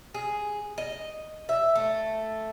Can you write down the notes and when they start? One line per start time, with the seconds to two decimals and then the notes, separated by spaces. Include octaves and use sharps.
0.14 G#4
0.78 D#5
1.49 E5
1.75 A3